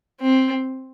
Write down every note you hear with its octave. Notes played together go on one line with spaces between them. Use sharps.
C4